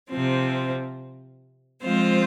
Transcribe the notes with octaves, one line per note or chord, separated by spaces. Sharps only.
C3 F3 C4
F3 G#3 C4 F4 C5